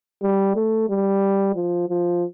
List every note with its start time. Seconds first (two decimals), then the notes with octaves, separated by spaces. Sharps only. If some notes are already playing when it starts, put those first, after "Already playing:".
0.23 G3
0.56 A3
0.90 G3
1.56 F3
1.89 F3